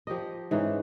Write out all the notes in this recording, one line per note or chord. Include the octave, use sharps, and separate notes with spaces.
F3 G4 A#4 D#5
G#2 E3 C#4 D#4